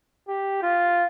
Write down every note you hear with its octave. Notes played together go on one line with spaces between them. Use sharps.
G4
F4